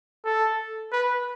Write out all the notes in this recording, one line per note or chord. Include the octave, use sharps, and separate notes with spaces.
A4
B4